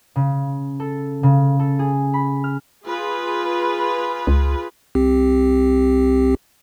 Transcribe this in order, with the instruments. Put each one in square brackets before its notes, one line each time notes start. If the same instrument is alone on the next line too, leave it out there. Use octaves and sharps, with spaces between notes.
[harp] C#3
A4
C#3
A4
G#4
B5
F6
[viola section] F4 G#4 B4
[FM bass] C#2
[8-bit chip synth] C2 C4 G4